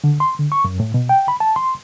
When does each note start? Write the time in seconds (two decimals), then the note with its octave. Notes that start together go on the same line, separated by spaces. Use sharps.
0.04 D3
0.20 C6
0.39 D3
0.52 C#6
0.65 F#2
0.80 A2
0.94 B2
1.09 G5
1.28 B5
1.40 A5
1.56 C6